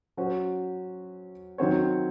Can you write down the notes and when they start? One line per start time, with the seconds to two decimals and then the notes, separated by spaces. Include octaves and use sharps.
0.17 F#3 C#4 F#4 C5
1.58 D#3 F#3 C4 F#4 C#5